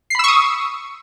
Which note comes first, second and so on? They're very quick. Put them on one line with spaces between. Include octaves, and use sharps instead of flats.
C7 B5 E6 C#6 D#6